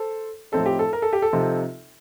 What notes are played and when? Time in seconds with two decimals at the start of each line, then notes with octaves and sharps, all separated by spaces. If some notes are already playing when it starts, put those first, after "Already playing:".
Already playing: A4 C5
0.52 A2 F3 C4 D#4 A4
0.66 G4
0.79 A4
0.93 A#4
1.02 A4
1.13 G4
1.22 A4
1.33 C3 F3 C4 D#4